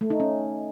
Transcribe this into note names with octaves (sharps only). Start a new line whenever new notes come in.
A3
D#4
C#4